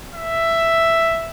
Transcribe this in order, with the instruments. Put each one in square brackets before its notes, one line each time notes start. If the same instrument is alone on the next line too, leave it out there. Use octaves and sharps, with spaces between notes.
[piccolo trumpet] E5